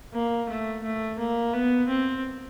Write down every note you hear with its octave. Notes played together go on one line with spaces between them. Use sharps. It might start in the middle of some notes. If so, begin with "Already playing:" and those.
A#3
A3
A3
A#3
B3
C4